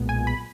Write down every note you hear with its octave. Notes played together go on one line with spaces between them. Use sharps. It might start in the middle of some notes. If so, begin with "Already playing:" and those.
Already playing: B1 A#2 G#3 B3
G#5
B5